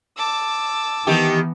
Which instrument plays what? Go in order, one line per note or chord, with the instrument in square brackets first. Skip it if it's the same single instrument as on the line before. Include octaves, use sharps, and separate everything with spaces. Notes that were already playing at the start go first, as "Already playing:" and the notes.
[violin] A5 E6 [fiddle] D6
[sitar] D#3 G4 [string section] E3 B3